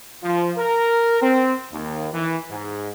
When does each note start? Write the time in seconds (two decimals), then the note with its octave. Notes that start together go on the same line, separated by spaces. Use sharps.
0.24 F3
0.57 A#4
1.21 C4
1.71 D#2
2.13 E3
2.50 G#2